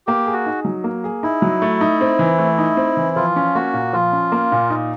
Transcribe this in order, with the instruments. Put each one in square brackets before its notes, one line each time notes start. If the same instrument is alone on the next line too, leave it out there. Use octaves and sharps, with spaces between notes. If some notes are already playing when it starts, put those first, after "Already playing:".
[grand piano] A#3 [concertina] G4
[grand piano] G#4
[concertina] F#4
[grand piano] D#4
F#3
A#3
G#4
[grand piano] D#4 [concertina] E4
[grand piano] F#3
A3
D#4
C4
E3
A3
D#4
C4
E3
[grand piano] F3 [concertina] F4
[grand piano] C#4
[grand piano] A#3 [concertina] F#4
[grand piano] A#2
[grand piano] F3 [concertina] F4
[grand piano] C#4
A#3
A#2
D#4